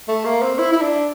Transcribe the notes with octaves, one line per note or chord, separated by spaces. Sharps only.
A3
A#3
C4
E4
E4
D4